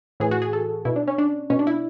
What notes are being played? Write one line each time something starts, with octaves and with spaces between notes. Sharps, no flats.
A2 E3 G#4
F#4
G#4
A4
B2 E4
D4
C#4
D4
B2 C#4
D4
E4